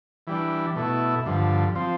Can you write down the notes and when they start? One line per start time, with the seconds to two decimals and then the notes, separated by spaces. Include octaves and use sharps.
0.27 E3 G3 D4
0.76 B2 A3 E4
1.26 G2 D3 F3
1.75 F3 C4